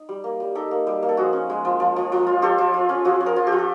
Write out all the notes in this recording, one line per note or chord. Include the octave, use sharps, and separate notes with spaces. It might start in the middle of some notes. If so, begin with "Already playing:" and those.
Already playing: D#4
G3
A#3
G3
D#4 G4 A4
A#3
G3
A#3
A4
F3 F#4 G#4
C#4
G#3
F3
F3
F3
F3
F4
F4 G4 A4
F3
F4
C#4
F3 F#4 G#4
C#4
G#4 A#4
F4
G4 A4
F4
A4